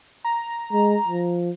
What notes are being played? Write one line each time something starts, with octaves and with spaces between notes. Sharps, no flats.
A#5
G#3
F3